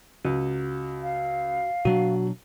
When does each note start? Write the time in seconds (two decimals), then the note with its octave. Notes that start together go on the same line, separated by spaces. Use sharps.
0.25 C#2 F#4
1.02 F5
1.85 B2 F#3 D4 F#4